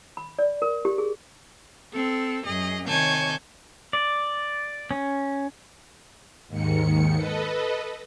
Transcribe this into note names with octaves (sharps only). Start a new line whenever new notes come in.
B5
D5
A#4
G4
G#4
C4 A4
F#2 G#4 D#5
C3 D#3 C#5 G#5 A5 G6
D5
C#4
D#2 G#2 D#3 C#7
A4 B4 D#5